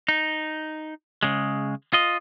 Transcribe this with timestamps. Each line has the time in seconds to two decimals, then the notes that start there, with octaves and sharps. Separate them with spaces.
0.09 D#4
1.23 C#3 G#3
1.93 F4 D#5